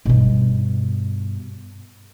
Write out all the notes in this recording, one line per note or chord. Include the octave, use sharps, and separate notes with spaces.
G2 B2